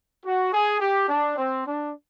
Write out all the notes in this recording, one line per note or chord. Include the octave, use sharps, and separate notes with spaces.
F#4
G#4
G4
D4
C4
D4